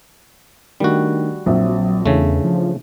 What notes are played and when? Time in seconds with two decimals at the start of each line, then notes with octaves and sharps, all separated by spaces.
0.80 D#3 G3 A3 D4 F#4
1.46 A#1 F#3 C4 E5
2.06 E2 C#3 E3 A3 D4
2.44 F3